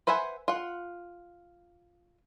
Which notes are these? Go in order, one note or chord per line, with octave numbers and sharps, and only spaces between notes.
B4 C5 E5 F#5 G#5
F4 F#5